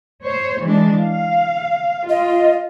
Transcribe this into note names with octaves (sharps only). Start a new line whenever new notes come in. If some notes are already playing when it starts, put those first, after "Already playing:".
C5 C#5
E3 G#3 D4
F5
F4 D#5